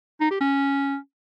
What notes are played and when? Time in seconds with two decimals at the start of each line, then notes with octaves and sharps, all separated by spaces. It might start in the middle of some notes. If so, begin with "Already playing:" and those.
0.21 D#4
0.31 G4
0.40 C#4